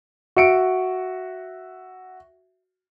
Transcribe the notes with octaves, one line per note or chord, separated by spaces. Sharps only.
F#4 E5 C#7 D7